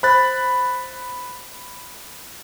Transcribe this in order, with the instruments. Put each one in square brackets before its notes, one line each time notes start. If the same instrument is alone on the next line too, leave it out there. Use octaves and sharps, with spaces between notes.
[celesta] C5 [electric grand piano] B5 F#6 A6